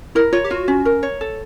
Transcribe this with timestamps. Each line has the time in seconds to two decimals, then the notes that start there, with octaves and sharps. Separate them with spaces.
0.15 E4 A#4
0.33 F4 C#5
0.44 G4
0.50 F4 F#4
0.68 C#4
0.85 A#4
1.03 C#5
1.21 A4